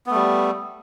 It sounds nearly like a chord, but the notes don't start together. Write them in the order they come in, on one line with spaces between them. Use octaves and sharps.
B3 A3 G3